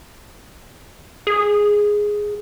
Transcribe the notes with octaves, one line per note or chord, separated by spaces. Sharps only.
G#4